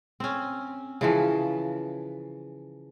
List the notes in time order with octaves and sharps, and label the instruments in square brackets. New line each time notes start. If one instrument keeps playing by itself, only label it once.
[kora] C4 C#4
C#3 E3 F3